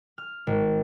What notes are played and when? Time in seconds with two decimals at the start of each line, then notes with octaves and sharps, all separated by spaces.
0.18 F6
0.47 G#1